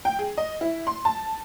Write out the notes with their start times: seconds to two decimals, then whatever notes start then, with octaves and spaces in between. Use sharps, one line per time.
0.05 G5
0.19 G#4
0.38 D#5
0.61 E4
0.87 C6
1.05 A5